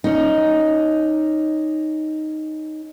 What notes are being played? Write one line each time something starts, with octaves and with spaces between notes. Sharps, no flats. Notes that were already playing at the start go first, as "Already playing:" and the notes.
C#4 D#4